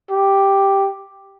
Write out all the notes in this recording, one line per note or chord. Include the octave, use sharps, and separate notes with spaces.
G4